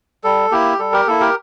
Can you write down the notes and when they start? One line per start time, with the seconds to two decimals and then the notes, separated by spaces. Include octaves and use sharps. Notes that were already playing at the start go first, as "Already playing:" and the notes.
0.24 G3 A4
0.51 A#3 E4 G4
0.79 G3 A4
0.93 G4 A#4
1.07 A#3 E4 A4
1.20 G4 A#4